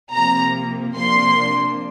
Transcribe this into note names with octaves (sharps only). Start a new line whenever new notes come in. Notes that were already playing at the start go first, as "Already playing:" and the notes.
C3 F3 A#3 A#5
C3 F3 A#3 D4 C6